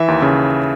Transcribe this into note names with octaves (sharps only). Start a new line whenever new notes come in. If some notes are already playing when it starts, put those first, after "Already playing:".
Already playing: E3 E5
D#2
C#3